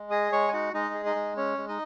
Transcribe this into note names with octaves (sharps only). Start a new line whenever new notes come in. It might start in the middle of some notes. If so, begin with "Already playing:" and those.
Already playing: G#3
G#4 D#5 D#6
G#3 C#5 C#6
G#5
D#4 F#4 F#5
G#3 D#4 D#5
G#4
D#4 D#5
G#3
C#4 C#5
G#3
D#4 D#5